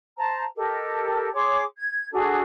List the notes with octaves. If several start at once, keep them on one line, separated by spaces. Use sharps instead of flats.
C5 A5 A#5
G4 A4 A#4 D#5
G#4 C#5 C6 D6
G#6
D4 F#4 G#4 A4